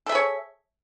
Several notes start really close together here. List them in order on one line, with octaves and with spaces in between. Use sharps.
A4 E5 G#4 C#5